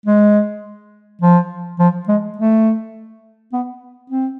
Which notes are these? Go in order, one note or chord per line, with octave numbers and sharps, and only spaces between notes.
G#3
F3
F3
G#3
A3
B3
C4